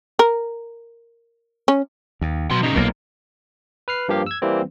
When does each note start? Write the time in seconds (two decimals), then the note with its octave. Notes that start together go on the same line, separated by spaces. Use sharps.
0.19 A#4
1.68 C#4
2.21 D#2
2.51 B2 F#3 C6
2.63 C#3 D#4
2.76 B1 A#2 A#3
3.88 B4 F6 C7
4.08 G2 F3 A#3 G4 F5
4.26 E6 G#6
4.42 E3 G3 A#3 C4